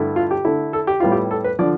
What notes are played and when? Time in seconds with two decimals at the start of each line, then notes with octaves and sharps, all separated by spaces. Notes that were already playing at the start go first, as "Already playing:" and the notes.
Already playing: G2 D3 A3 E4
0.16 F4
0.31 G4
0.45 D3 A3 E4
0.73 A4
0.87 G4
1.00 A2 G3 B3 E4 F4
1.12 G4
1.31 A4
1.44 B4
1.59 D3 F3 D5